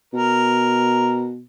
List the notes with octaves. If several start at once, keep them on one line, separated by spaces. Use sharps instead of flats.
B2 A#4